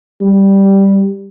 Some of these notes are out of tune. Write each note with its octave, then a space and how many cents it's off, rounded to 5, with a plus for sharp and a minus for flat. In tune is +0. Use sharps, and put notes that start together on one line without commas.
G3 +0